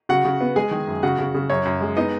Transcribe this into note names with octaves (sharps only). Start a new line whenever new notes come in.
C#3 F#4 F#5
C#3
B3
G#3 G#4 G#5
D#3
F#2
C#3 F#4 F#5
C#3
C#3
F#2 C#5
F#2
G#3
B3 D#4 D#5